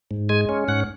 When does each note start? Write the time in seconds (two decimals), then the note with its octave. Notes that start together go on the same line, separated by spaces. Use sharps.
0.11 G#2
0.29 G#3 G#5
0.49 C#4
0.68 G#2 F#5